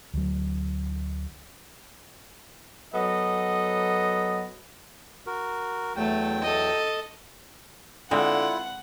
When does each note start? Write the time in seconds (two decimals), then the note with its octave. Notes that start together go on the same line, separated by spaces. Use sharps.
0.14 D2 F#3
2.94 F#3 B3 A4 D#5
5.27 F#4 A#4
5.96 E2 F#3 A3 G5
6.42 A4 D#5
8.11 D3 G#3 C4 E4 F4 F#5